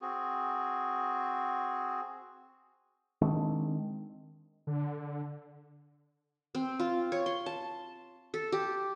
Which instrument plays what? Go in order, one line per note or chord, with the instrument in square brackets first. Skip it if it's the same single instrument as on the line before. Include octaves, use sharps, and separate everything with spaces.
[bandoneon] C4 F#4 G#4
[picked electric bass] D#3 G#3 C4 D4
[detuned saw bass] D3
[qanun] C4
F4
C#5
C6
A5
A4
G4